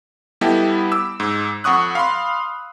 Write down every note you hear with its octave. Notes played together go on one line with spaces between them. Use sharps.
G3 B3 E4 G4 A4 D#5
D6 E6
G#2
F2 F#5 C#6 D#6 F#6
F5 B5 C6